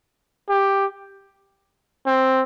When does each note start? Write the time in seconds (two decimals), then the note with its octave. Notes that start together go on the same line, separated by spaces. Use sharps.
0.49 G4
2.06 C4